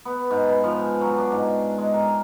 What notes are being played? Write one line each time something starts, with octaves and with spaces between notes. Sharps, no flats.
B3
G#2
B4
F3
G#5
F#3
D4
G#2
G#3
A#4